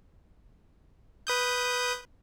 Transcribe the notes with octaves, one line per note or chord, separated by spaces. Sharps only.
B4 D#6 G6